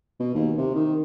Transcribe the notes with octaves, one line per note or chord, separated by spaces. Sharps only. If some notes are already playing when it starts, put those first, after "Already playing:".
B2
D#2
C3
D#3